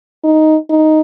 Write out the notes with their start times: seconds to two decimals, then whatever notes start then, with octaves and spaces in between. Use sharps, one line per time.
0.24 D#4
0.69 D#4